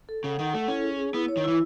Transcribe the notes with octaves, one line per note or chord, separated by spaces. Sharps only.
A4
C#3 F#5
D#3 F#5
A3 A4
C#4 E4
G#4
G#4
B3 E4
C#5
D#3
E3 E4